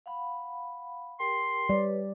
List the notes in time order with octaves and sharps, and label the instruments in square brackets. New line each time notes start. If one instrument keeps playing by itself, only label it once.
[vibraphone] F5 F#5 B5
[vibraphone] G4 A#4 G5 [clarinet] C6
[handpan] G3 D5 [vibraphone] B4 C#5